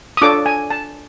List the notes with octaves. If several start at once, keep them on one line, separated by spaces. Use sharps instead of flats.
D#6
D4 F4 A4 C#5 D6
G#5
A5